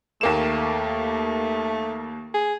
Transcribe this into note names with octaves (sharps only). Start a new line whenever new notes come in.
D#2 A3 A#3 E7
G#4